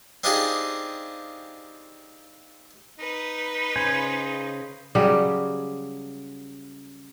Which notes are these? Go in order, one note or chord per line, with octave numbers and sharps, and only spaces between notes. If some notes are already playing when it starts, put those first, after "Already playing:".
C4 D4 D#4 F4 G4 G#4
D#4 B4
C#3 C5 G#5
C#3 F#3 G3 G4